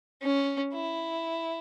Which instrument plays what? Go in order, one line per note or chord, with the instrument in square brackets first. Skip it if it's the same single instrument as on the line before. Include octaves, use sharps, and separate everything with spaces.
[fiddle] C#4
E4